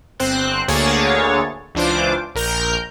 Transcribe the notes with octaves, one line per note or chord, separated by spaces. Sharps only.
G1 C4 C5 F#6
D2 D3 A#3 G#4 C#5 A6
C#2 E3 D4 F4 C5 D6
A#1 A#4 F6 G6